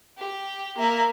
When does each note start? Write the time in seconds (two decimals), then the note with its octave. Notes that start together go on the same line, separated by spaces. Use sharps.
0.19 G4
0.78 A#3 E5